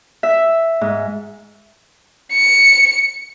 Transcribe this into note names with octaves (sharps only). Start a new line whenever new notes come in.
E5
G#2
C#7